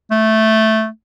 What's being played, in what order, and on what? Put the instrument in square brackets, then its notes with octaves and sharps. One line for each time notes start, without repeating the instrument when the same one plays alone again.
[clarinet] A3